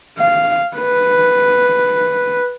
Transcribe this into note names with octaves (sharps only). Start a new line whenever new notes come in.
F5
B4